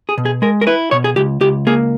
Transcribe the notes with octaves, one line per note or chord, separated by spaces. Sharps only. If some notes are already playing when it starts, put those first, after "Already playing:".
G#4
B2
G#4
G#3 A#4
A#4
E4 B4
B2 C#5
G#4
C#2 G4
C#2 G4
A#3 G#4